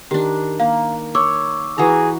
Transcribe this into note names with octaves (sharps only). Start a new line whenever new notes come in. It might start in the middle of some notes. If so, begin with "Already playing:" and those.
D#3 D4 G4
A#3 F5
C#5 C#6 D6 E6
E3 F#4 G#4 A#5